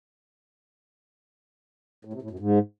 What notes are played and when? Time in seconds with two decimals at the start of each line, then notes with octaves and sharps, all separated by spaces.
2.05 A2
2.13 C3
2.22 A2
2.31 F#2
2.39 G#2